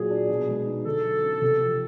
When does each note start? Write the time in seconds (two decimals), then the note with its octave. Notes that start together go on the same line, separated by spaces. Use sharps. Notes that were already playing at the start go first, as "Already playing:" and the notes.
Already playing: A#2 F#3 G#4
0.10 D4
0.29 B2
0.49 G#3
0.67 D#4
0.85 D3 A4
1.05 F#3
1.23 C#4
1.41 C3
1.61 F3